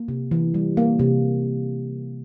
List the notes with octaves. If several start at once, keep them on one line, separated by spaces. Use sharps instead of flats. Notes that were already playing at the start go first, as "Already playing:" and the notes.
Already playing: A#3
C3
E3
G3
A#3
C3